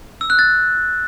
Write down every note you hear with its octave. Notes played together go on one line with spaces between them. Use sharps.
E6
F#6
A6